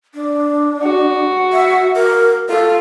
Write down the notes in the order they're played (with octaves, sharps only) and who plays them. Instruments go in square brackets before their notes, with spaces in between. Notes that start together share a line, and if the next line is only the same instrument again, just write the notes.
[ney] D4
[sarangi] F#4
[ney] E5
A#4
[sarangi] F4 [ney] A4